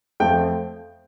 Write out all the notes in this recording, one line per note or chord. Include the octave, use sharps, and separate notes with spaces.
F2 F3 A3 G5